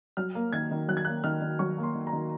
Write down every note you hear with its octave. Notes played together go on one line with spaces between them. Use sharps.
F#3 F6
A#3
D#3 G#6
D#3
F#3 F#6
G#6
A#3 F#6
D#3 F6
D#3
F#3 C#6
A#3
C6
D#3
A#5
D#3